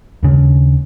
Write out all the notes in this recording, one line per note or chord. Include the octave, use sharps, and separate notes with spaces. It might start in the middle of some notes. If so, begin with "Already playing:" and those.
D#2 C#3